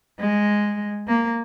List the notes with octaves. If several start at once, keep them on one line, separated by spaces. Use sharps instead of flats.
G#3
A#3